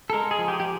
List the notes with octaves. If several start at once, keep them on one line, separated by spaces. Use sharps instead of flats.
A4
G#3 A#4
G#4
F3
G4
G4